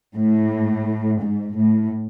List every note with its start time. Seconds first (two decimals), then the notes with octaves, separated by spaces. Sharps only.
0.16 A2
1.21 G#2
1.57 A2